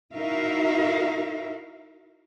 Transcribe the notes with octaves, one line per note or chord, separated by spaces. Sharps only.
D#4 E4 F#4 A#4 E5 F5